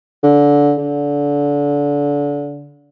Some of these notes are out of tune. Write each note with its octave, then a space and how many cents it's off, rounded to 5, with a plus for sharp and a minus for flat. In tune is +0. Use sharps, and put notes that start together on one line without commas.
D3 -20
D3 -25